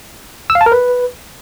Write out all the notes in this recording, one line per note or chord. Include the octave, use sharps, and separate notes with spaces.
E6
F5
A5
A#4
B4